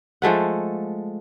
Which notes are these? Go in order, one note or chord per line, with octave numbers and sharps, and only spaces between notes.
F3 G#3 A3 F#5